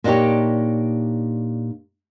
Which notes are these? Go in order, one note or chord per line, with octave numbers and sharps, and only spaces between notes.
A#2 D4 D#4 F#4 G4 C#5